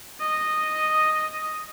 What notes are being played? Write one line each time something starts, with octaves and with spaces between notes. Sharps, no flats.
D#5